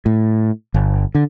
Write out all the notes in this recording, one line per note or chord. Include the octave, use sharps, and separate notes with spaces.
A2
G1
D3